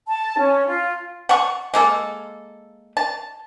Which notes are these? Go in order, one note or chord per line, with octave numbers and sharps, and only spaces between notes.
A5
C#4
F4
F#5 A5 C#6
G#3 A#3 A4
A5